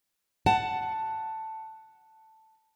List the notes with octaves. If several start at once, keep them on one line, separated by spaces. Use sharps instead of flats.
F#5 A5